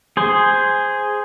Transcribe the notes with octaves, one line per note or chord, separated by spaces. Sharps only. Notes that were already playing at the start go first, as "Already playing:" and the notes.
G#4 C5